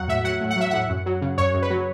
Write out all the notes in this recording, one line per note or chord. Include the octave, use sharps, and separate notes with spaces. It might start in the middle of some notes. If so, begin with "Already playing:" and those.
Already playing: E2 F#3 F#5
A2 E5
F#3 F#5
A2
F#5
F#3 E5
A2 F#5
F#2
F#3
C#3
F#2 C#5
F#2
B4
F#3